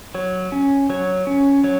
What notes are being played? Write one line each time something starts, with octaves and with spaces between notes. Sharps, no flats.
F#3 C#5
C#4
F#3 C#5
C#4
F#3 C#5